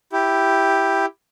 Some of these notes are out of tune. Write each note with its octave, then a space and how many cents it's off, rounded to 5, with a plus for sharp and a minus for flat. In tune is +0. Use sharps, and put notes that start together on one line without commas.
E4 +0 G4 +0